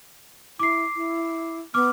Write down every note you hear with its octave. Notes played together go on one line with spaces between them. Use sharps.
E4 D6 C7
E4
B3 D6 F6